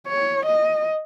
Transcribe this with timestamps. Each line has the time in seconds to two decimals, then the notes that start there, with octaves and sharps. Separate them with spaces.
0.08 C#5
0.46 D#5